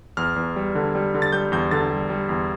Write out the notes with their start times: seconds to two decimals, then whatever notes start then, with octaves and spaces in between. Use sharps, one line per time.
0.17 E2 F6
0.36 E2
0.56 G3
0.75 D3
0.95 G3
1.14 D3
1.22 A6
1.33 G3 G6
1.52 E2 G6
1.71 D3 A6
1.90 G3
2.10 G3
2.29 E2